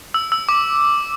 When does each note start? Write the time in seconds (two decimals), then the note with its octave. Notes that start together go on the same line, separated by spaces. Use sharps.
0.14 E6
0.32 E6
0.49 D6